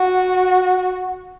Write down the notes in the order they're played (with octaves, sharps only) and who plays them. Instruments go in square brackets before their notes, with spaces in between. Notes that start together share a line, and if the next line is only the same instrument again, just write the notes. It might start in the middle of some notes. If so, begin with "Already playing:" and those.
Already playing: [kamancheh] F#4